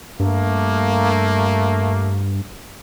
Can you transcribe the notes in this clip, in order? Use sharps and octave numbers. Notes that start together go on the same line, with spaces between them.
G2 A3 A#3